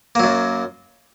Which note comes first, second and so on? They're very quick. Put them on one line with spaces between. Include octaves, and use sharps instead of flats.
A#3 F#3 F#2